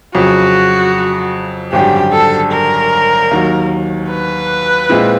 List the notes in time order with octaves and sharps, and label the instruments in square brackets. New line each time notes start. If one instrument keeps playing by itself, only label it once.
[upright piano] F2 C#3 F#3 [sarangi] F#4
[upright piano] G#1 F#2 D3 G3 [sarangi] G4
[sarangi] A4
A#4
[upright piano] D#2 D#3 F#3
[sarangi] B4
[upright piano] A#2 F3 G#3 C4 E4